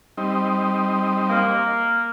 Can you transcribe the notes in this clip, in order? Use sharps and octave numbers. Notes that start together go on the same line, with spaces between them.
G3 C4 D#4
A#3